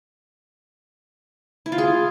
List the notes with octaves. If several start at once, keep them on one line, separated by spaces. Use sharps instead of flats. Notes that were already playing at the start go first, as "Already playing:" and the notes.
E4
F4
G#4